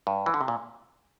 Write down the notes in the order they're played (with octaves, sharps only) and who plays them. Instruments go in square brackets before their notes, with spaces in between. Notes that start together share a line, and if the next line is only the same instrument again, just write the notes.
[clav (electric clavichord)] G2
E3
D3
C3
A#2